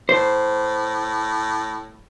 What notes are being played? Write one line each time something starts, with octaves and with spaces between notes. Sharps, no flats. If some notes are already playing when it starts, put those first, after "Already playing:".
A2 C5